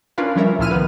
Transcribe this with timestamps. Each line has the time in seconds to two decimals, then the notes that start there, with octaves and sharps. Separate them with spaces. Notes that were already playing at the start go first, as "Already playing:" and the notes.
0.18 C#4 D4 F4 A#4 B4 F5
0.36 F3 G3 C#4 A#4 E5
0.59 C#2 A#2 F3 E4 F6 D#7
0.71 D#3 F3 B3 B4